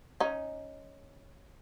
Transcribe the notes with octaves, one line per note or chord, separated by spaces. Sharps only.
C#4 D#4